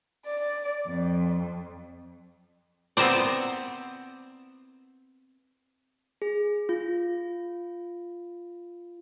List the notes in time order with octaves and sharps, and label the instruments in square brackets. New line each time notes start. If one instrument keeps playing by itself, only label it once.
[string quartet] D5
F2
[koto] B3 C4 E4 A#4 C5 D5
[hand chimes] G#4
F4